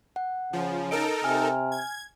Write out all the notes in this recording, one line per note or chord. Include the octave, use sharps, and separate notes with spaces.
F#5
C#3 F3
D#4 A4 A#4 D7
C3 G#5 F6
G#6